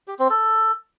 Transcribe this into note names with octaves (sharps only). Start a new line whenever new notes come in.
G4
C4
A4